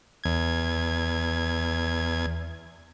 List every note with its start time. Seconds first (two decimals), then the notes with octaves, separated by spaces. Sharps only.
0.24 E2 G#6